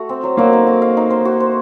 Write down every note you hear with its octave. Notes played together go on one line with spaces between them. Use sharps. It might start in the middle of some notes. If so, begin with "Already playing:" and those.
Already playing: A3 F#4
C4
F#3
F#3 A#3
D#4
F#4
F5
D#4
C5
F#4
C5